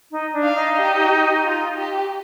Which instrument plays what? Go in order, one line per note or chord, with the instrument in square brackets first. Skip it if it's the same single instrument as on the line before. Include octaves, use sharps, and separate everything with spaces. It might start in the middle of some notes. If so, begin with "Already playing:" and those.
[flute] D#4
D4
[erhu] F5
[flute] D#4
[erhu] G4
F4
G4